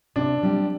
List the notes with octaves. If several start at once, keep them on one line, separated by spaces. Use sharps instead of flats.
C3 D4
G3 C4